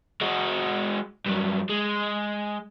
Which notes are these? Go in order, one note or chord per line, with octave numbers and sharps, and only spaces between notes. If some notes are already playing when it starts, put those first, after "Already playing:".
G#3 F#4
G2 F#3
G#3